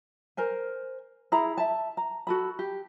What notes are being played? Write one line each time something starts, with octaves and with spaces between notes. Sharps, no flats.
A#4 C5 G#5
E4 G#4 A#5 B5
E5 A5
A#5
F#4 A4 B5
G4